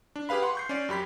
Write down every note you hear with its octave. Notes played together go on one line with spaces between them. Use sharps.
D4
G4 G#4 B4 F5 B5
F#5 C6
C#6 G6 C7
C#4 D5
F#2 G4 B5 B6